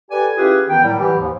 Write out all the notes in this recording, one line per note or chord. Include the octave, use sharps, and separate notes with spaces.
G4 A4 B4 D5 G#5
C#4 E4 F4 G4 G#4 B4
D#3 E3 B3 G5
A2 D#3 F#3 G3
E3 B3 G4
D#2 G#2 F3